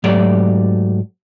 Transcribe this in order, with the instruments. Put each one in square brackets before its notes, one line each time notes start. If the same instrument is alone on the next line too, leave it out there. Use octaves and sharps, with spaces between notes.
[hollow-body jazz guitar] G#2 F#3 A3 G4 D5